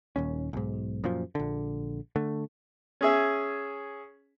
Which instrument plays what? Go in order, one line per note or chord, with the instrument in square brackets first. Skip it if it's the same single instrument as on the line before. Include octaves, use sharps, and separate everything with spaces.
[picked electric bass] D#1 D#2 C#4
B1 G#2
F#2 A#2 F3
A#1 D3
D3 A3
[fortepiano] C#4 G#4 E5